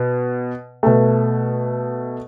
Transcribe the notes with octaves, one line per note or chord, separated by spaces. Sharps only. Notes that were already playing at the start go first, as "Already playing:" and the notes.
Already playing: B2
B2 A3